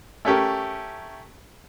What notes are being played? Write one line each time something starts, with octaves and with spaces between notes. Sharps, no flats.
A3 C#4 G4 A#4